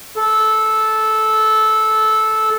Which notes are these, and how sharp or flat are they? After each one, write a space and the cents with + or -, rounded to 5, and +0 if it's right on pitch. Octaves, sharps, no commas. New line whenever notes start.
A4 -15